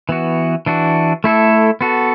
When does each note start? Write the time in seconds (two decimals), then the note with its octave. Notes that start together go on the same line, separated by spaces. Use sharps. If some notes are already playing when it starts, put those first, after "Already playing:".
0.09 E3 B3 F#4
0.66 E3 D4 F#4
1.24 A3 E4 A4
1.81 B3 F#4 A4